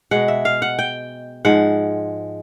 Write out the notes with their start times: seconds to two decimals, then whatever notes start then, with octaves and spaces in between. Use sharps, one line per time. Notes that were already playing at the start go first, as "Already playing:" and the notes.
0.11 B2 G#3 F#5
0.28 E5
0.45 F5
0.62 F#5
0.79 G5
1.45 G#2 F3 G#3 F#5